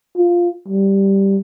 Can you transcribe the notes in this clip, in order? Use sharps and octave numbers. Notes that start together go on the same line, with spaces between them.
F4
G3